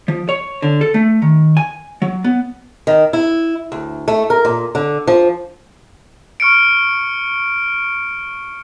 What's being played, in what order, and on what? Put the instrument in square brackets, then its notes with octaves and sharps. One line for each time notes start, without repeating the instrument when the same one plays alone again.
[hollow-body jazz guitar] F3
C#5
D3
A4
A3
D#3
G#5
F#3
B3
[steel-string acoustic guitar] D#3
E4
D2
A3
A#4
A#2
D3
F3
[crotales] C#6 F6 C#7 D7